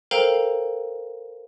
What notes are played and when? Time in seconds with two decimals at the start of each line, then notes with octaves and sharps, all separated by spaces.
0.11 A4 A#4 C5 F5 G5 A#5